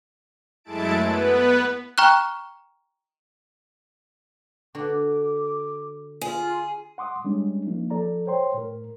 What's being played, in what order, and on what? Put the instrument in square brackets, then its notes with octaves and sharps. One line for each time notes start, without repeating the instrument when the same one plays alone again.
[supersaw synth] F#2 G#3 A3 E4 A5 D7
B3 B4
[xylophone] G5 A#5 C#6 F6 F#6
[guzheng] D3 F#4 [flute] D6
[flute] F4 [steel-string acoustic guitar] G#4
[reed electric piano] F#5 C6 D6 D#6
G3 G#3 C#4 D4
F3 A#3 D#4
F3 A4 D5 A#5
C5 C#5 G5 C6
A2 A#4